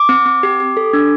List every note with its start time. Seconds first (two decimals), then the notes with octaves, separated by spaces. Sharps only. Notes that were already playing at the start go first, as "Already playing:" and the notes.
Already playing: D6
0.09 C4
0.26 C4
0.43 G4
0.60 G4
0.77 A4
0.93 D4